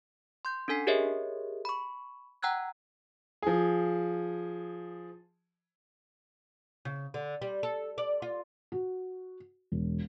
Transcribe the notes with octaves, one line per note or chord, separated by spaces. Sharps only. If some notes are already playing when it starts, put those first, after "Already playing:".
C6 G6
C#4 D4 A4 G#5 B6 C7
G4 G#4 A#4 C#5 D#5 E5
B5 C#6
F#5 G5 A#5 E6 F#6 G#6
F3 G#4
C#3
D3
G3
A4
D5
F4
F#4
E1